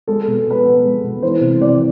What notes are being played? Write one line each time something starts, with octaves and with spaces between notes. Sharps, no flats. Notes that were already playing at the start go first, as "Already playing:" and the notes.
G#3 A4
B2
B2 B4
B3
G#3
B2
E3 C5
C3
C3 D5